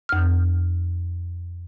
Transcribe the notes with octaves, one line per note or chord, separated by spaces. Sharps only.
F2 F6